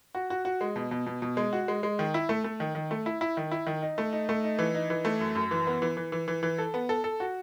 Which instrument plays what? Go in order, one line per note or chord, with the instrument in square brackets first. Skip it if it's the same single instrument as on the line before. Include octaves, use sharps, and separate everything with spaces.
[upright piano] F#4
F#4
F#4
G#3
B2
B2
B2
B2
G#3
F#4
G#3
G#3
D#3
E4
A3
A3
D#3
D#3
A3
E4
E4
D#3
E4
D#3
D#4
A3
D#4
A3
D#4
E3
D#4
E3
A3
F#2
F#2
E3
B3
E3
E3
E3
E3
E3
A4
B3
A4
A4
F#4